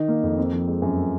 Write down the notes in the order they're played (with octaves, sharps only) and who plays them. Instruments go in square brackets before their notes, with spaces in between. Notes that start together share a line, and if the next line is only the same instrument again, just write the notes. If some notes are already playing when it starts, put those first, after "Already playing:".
Already playing: [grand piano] D#3 D#4
A#3
F2
C4
F3
G#3
F#2